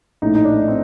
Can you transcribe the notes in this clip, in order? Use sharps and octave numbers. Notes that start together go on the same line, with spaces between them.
A#1 A2 A3 D#4
D#4
D4
C4